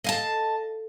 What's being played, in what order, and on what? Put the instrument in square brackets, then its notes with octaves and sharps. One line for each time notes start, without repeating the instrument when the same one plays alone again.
[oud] A4 F5 [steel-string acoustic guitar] D#5 G#5 A5